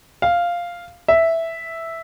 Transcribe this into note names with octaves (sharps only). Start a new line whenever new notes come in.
F5
E5